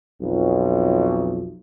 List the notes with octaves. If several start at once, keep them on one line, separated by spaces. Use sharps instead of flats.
B1 F2